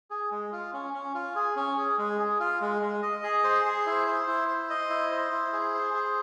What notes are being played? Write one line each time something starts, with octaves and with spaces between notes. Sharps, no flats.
G#4
G#3
F4
C#4
C#4
F4
G#4
C#4
G#4
G#3
G#4
F4
G#3
G#3
D#5
G#4
C5
G#4
E4
C5
E4
C5
D#5
E4
C5
E4
G#4
C5
G#4